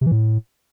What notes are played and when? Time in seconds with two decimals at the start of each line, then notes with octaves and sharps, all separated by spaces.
0.01 C3
0.06 E3
0.12 A2